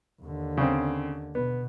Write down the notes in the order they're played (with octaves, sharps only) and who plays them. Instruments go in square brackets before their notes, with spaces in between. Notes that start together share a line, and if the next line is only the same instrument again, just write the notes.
[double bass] D#2 D3
[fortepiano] C#3 C4
[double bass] B2 [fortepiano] B3